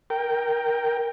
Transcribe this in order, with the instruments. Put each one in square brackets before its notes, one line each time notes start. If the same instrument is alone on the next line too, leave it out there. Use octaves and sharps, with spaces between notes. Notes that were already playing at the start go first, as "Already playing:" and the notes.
[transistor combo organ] A#4 G5